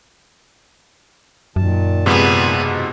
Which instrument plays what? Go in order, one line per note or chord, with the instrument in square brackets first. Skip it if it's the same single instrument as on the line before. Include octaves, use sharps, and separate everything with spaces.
[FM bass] F#2 [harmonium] A#2 D#3 A5
[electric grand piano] G#2 C3 F3 [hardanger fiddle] B3 G#4
[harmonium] B2